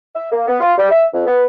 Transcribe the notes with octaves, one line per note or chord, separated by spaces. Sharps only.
E5
A#3
B3
F4
G3
E5
F2
B3